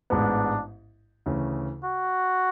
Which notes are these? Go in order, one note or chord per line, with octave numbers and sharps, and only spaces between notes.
A1 G#2 G#3 B3 D4
D2 C#3 E3
F#4